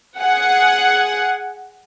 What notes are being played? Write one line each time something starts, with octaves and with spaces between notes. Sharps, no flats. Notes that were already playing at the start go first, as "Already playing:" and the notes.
G#4 F#5